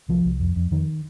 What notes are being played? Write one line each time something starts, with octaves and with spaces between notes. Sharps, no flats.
C2 F3
C2
F2
F2
F2 D#3